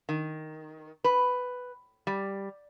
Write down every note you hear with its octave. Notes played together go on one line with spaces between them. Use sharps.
D#3
B4
G3